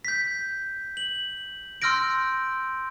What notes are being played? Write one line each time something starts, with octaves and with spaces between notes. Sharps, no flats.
G6 B6
F#7
C6 E6 F6 G6 A#6 D7